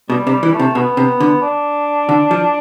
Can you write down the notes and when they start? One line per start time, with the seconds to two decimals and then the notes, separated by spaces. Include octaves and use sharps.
0.10 B2 G3
0.27 C3
0.32 G3
0.43 E3
0.54 A3
0.59 C3
0.75 B2 B3
0.97 C3
1.20 D3
1.42 D4
2.09 D3
2.31 F3